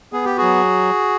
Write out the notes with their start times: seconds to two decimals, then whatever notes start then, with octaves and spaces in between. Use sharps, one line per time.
0.13 B3 G#4
0.25 G4
0.37 F#3 F#4 G#4